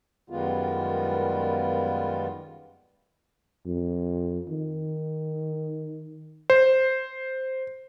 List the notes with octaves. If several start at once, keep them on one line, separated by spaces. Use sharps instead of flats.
F#2 D#3 G3 G#3 B3 F4
F2
D#3
C5